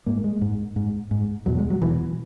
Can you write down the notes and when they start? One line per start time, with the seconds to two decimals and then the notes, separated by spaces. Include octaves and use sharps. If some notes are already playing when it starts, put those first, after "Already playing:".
0.06 G#2 A#3
0.24 G#3
0.41 G#2
0.76 G#2
1.11 G#2
1.46 E2 B2 F#3
1.59 G#3
1.70 F#3
1.82 E2 B2 E3